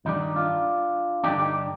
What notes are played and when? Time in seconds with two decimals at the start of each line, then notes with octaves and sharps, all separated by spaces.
0.05 G2 D#3 G3 D4 D#4
0.21 D#4
0.36 D4 F4
1.24 G2 D3 G3 D4 D#4 G4
1.39 D#4 G4